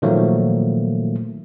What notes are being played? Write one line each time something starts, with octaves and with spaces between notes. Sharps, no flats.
A#2 D#3 F3 F#3 A3 A#3